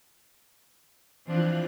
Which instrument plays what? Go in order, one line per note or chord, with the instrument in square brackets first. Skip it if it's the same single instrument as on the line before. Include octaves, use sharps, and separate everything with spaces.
[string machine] E3 F4 F#6 [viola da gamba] F3 C4 D4